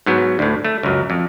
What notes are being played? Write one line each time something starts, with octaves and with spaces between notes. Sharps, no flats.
G#2 F#3 B3
D2 A2
A3
C#2 F#2
F2